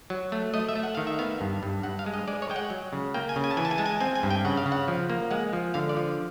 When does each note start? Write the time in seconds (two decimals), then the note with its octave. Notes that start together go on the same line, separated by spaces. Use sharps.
0.10 F#3
0.32 A3
0.54 A3 D#5
0.69 E5
0.75 A3
0.83 F#5
0.95 D#3 F5
1.07 E5
1.19 B3 F5
1.41 G2
1.63 G2
1.83 G2 F#5
1.99 F5
2.06 G#3
2.14 D#5
2.28 G#3 D5
2.42 C#5
2.50 G#3 G5
2.56 F#5
2.70 F#3
2.93 C#3
3.14 A#3 G5
3.29 G#5
3.36 C#3
3.44 G#5
3.51 A5
3.57 E3 G#5
3.65 A5
3.71 G#5
3.78 G#3 A5
3.86 G#5
4.00 C4 G#5
4.15 G#5
4.23 G2
4.30 G5
4.45 C#3 F#5
4.57 F5
4.66 C#3
4.72 F#5
4.88 F3
5.10 A#3
5.31 G#3 F#5
5.53 F3
5.74 D3 F5
5.89 D5
5.97 F3